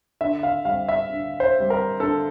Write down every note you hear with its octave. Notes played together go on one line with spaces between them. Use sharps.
D3 E5
F5
G3 C4 F5
E5
D3
C5
G3 C4
A#4
D3 A4